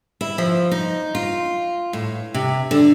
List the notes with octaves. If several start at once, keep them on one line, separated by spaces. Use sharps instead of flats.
E4
F3
D#4
F4
A2
C3
D3